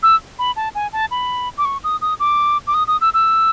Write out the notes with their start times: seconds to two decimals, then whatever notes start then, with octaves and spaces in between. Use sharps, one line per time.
0.03 E6
0.39 B5
0.56 A5
0.75 G#5
0.93 A5
1.11 B5
1.58 D6
1.65 C#6
1.84 D#6
2.01 D#6
2.20 D6
2.67 D6
2.74 D#6
2.87 D#6
3.01 E6
3.14 E6